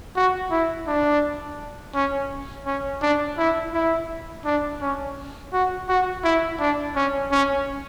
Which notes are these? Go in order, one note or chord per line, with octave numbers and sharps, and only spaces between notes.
F#4
E4
D4
C#4
C#4
D4
E4
E4
D4
C#4
F#4
F#4
E4
D4
C#4
C#4